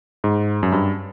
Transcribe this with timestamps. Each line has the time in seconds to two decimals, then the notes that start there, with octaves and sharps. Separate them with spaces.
0.24 G#2
0.63 F#2
0.72 G2